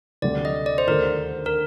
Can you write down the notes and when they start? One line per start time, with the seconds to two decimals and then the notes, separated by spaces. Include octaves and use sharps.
0.22 D2 C3 G3 C4 D5
0.45 D#5
0.66 D5
0.78 C5
0.87 D#2 D3 A3 D4 A#4
1.46 A#4